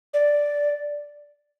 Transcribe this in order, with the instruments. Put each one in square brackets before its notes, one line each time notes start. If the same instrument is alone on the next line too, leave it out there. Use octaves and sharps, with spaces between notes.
[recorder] D5